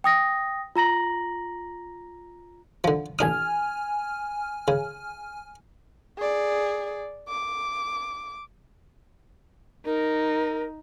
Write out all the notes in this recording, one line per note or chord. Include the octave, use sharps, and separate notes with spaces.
G5 D#6 A#6
F4 A#5 A#6 F#7
D3 F3
A1 D4 G#5 D#6 F6
C#3
G#4 D5
D6
D#4 A#4